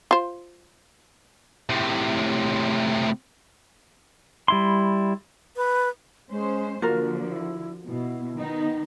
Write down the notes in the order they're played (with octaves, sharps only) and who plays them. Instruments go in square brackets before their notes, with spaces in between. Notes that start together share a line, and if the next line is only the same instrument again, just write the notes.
[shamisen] F4 C5
[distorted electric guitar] A2 C3
[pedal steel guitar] G3 E4 C6
[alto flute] B4
[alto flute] G#3 [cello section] C#4 C5
[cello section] D3 F3 [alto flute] A#3 [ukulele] F4 F#4 A#4
[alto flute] E4
[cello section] B2 [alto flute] E4
[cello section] D#3 B3 D#4